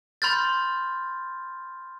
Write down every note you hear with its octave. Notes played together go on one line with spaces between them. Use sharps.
B5 C6 F6 G6 A6